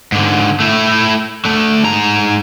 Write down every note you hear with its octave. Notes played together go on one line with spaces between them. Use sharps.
G#2 D3
A3 E4
D3 A3
G#2 A#5